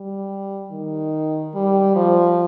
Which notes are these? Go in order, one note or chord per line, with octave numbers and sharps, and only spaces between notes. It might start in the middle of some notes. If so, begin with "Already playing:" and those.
Already playing: G3
D#3
G3
F3